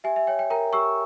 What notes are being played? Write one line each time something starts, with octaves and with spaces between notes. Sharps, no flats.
G4 E5 G#5
E5
C#5 G5
G5
A#4 G5 A#5
G4 C#6 E6